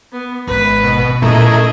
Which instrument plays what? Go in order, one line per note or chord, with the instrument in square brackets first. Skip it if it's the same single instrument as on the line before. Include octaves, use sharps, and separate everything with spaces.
[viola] B3
[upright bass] G#1 [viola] B4
[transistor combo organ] B2
[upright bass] A#2 C#4 [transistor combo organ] A3 E4 A#4 [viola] G#4 D#5